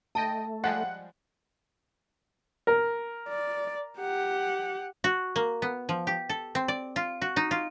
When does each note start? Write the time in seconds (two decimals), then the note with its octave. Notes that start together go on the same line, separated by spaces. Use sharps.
0.15 A3 D#5 G5 A5 D#6
0.64 F3 G3 G#3 F#5
2.67 A#4
3.29 D5
3.99 G4 F#5
5.04 F#4
5.36 A#3
5.62 B3
5.89 F3
6.07 G4
6.29 A4
6.55 C4
6.68 D5
6.96 F4
7.22 F#4
7.36 D#4
7.51 F4